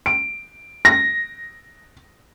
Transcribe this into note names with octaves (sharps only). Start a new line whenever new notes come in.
D7
A#6